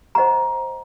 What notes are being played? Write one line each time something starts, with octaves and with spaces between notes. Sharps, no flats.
C5 D#5 F#5 A#5 C#6